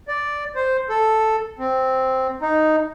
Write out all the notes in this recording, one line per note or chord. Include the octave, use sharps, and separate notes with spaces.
D5
C5
A4
C4
D#4